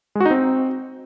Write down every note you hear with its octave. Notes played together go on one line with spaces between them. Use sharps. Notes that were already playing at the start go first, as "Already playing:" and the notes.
G#3
F#4
D#4
C4